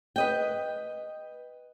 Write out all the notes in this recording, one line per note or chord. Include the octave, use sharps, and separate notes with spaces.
B4 D#5 G5